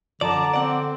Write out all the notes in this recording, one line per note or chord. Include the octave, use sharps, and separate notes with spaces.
F#2 D3 F3 D5 A5 A#5 D6
C4 D5 F#5